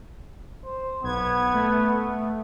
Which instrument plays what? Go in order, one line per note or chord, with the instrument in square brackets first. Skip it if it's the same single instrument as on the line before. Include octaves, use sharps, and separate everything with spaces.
[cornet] C5
[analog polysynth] B1 G#6 [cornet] B3
[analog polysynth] A3